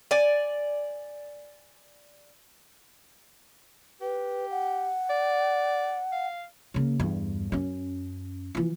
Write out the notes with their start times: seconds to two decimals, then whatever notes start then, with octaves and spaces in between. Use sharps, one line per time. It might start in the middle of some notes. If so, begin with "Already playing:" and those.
0.11 D5 G#5
4.01 G4 B4
4.51 F#5
5.10 D5
6.12 F5
6.74 C#3 A#3
6.99 E2 G2
7.52 F#2 C#4
8.55 E3 F3